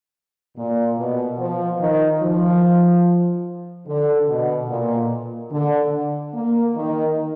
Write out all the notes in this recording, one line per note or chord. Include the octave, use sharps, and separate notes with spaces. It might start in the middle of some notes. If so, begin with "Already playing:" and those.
A#2
B2
F3
D#3
F3
D3
B2
A#2
D3
A#3
D#3